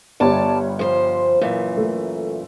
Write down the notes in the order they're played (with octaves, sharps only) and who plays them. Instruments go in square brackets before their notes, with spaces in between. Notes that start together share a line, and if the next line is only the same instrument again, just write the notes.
[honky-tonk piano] G1 G3 C#5 [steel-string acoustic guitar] D5 A5
[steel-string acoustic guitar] F3 C5
F#2 A#2 E3
[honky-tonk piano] A3